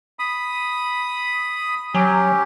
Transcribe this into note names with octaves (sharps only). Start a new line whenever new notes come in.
B5 D#6
F#3 C#4 G4